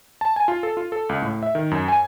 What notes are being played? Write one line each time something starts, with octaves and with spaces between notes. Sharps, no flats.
A5
G#5
F4
A4
F4
A4
C#2
A2
E5
D#3
F#2
G#5